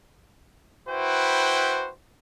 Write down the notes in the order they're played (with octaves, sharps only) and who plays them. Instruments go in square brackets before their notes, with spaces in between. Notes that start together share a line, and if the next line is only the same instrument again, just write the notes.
[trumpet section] E4 F#4 B4 C5 G5